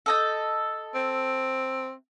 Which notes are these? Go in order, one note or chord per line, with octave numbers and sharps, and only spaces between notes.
A4 D#5 G6
C4